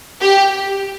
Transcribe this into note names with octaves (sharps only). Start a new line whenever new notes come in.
G4